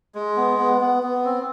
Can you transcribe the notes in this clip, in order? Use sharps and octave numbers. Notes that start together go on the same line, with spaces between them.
G#3
B3
B3
B3
B3
C4